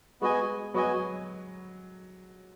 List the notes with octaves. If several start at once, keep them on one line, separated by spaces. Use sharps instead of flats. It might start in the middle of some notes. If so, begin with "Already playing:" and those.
G#3 B3 F#4 D#5 G#5
F#3 B3 F#4 D#5 G#5